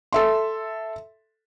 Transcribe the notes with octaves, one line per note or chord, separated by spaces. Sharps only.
A4 E5 C6